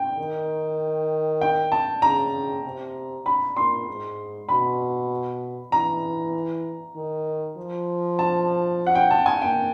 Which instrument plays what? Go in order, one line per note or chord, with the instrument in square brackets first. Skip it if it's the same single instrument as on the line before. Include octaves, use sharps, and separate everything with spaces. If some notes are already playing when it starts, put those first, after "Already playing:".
Already playing: [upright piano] G5
[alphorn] D#3
[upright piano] G5
A5
[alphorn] C#3 [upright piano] A#5
[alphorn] C3
[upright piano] B5
[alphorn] A#2 [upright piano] C6
[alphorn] G#2
[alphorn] B2 [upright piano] B5
[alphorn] E3 [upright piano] A#5
[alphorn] D#3
F3
[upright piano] A5
F#5
G5
A5
G#5
[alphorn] A#3 [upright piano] G5